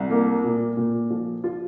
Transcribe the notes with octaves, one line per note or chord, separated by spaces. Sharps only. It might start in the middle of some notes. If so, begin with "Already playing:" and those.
Already playing: C2
A#3
A#2
A#2
F3
F4